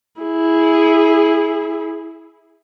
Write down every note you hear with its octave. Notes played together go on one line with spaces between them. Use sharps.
E4 G#4